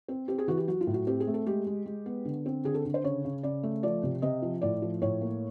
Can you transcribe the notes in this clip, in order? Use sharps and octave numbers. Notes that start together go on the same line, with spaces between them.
C4
C4 G4
G#4
E3 F#4
G4
F#3 F#4
F4
A2
F#4
C4 G4
G#4
A3
A4
G#3 G4
G#3
G#3
B3
D3
C4
D3 G#4
A4
D3
C5
C#3 C#5
C#3
C#3 D5
A3
F3 D5
C3
C3 D#5
F3
A2 D5
F3
A2 C#5
A#3